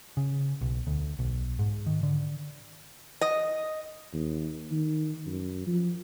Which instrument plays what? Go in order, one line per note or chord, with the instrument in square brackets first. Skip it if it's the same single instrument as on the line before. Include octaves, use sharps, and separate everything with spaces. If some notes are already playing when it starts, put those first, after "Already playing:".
[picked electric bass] C#3
B1
D2
B1
G#2
D#3
D3
[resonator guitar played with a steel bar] D#5
[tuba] D#2
D#3
F#2
F3